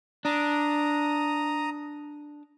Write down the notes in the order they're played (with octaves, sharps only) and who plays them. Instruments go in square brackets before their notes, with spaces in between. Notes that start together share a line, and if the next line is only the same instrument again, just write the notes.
[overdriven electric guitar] D4 [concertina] A#5 D#6